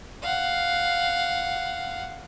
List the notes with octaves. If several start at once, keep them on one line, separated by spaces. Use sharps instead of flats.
F5 F#5